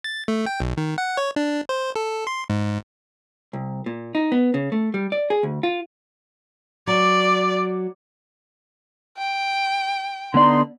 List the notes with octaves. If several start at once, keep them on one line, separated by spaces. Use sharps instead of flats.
A6
A3
G5
B1
D#3
F#5
C#5
D4
C5
A4
C6
G#2
C2
A#2
D#4
B3
C#3
A3
G3
D5
G#4
D2
F4
F#3 D5
G5
D3 B3 D#4 D5 C6